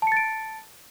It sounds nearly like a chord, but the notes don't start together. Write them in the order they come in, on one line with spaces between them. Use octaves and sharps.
A5 C#7 A6 D7